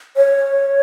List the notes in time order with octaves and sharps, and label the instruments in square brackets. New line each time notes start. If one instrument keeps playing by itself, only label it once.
[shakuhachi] C#5